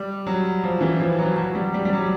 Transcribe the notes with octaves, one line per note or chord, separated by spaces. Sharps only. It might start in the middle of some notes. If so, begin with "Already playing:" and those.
Already playing: G3
F#3
F3
E3
F3
F#3
F#3
G3
G3
G3
F#3